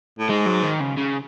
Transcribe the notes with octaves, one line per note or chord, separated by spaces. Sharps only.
A2
G#2 G#3
F#3
D#3
C#3
C#3